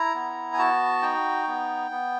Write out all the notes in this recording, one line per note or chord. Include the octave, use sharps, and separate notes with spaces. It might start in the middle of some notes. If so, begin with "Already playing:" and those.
Already playing: E4 A#5
B3
G#5
F#4 A5
D#4 G5
B3
B3